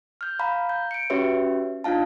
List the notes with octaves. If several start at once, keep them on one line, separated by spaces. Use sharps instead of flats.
F6 G6
F5 A#5 B5
G6
C#7 D7
C#4 F#4 G4 B4 C#5 E5
D4 D#4 F4 F5 A5